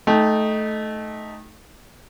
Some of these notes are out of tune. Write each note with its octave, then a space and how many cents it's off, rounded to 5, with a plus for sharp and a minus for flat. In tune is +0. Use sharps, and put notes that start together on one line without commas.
A3 -15 D#4 +0 G5 +0